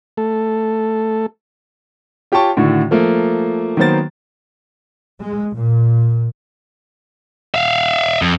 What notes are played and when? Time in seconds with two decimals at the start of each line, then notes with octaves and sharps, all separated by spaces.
0.17 A3 A4
2.32 F4 G4 C#5 G5 A5 C#6
2.57 A2 D3 D#3 F#4
2.91 F3 A3 A#3
3.77 D#3 F#3 A#3 B3 C5 A6
5.20 G#3
5.57 A#2
7.54 E5 F5
8.22 F2